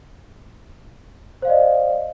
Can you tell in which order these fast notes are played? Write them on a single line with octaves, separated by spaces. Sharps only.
C5 F5 D5 D#5